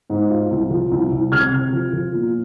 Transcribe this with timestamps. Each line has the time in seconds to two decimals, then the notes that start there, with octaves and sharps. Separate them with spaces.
0.10 G#2
0.30 F4
0.51 C2
0.71 F3
0.92 C2
1.12 C2
1.32 C3 F6 G#6
1.52 C3
1.73 F3
1.93 F3
2.14 A#2